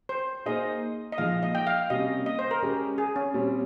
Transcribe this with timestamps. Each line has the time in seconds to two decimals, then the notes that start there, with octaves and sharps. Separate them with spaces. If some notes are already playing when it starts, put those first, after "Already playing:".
0.09 C5
0.46 A#3 D#4 G#4 C5 D#5
1.12 D#5
1.18 A#2 F3 G#3 D#4 F5
1.43 D#5
1.55 G5
1.67 F5
1.90 C3 G3 A#3 C#4 D#5
2.26 D#5
2.39 C5
2.51 A#4
2.62 G#3 C#4 G4
2.98 G#4
3.16 C#4
3.34 A#2 G3 C4